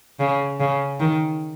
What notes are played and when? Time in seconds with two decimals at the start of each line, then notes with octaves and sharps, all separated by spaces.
0.20 C#3
0.60 C#3
1.00 D#3